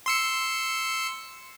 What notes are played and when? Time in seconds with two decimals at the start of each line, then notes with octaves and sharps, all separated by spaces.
0.06 C6 E6 C#7